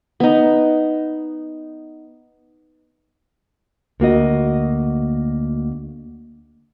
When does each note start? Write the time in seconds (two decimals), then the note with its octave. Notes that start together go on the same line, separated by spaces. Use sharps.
0.20 B3 D#4
4.00 D2 A#3 F#4 D#5